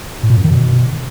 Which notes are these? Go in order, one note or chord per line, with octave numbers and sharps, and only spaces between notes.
A2
A#2
F#2
D#3
B2